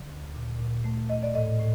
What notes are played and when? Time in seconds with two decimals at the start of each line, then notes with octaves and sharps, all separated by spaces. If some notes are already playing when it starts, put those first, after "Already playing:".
Already playing: D3
0.10 D2
0.35 A#2
0.59 A#2
0.84 A3
1.09 A3 D#5
1.23 D5
1.34 A2 D#5
1.60 A2